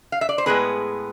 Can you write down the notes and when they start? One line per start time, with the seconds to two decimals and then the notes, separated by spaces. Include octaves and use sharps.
0.12 F5
0.21 E5
0.29 D5
0.38 C5
0.46 A2 G#3 B3 G#4 B4